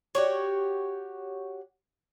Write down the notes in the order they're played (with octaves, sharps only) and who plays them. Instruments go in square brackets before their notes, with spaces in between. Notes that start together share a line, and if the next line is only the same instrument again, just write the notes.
[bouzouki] F#4 G4 C#5